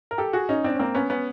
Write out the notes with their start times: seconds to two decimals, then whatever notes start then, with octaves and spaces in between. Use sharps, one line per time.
0.11 A#4
0.18 G4 A4
0.33 F#4 G#4
0.49 C#4 D#4
0.64 C4 D4
0.75 C#4
0.79 A#3 C4
0.95 B3 C#4
1.10 B3 C#4